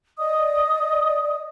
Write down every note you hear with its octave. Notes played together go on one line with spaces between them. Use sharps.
D5 D#5 D#6